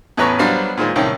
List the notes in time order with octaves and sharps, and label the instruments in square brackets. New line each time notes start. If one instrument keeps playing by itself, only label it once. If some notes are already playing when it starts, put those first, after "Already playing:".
[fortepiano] E2 A2 C#4 B4 A#5 C#6
F#3 G3 B3 D4 C5 F5
A#2 D#3 G#3 C5
C2 A2 D#3 C#4 G5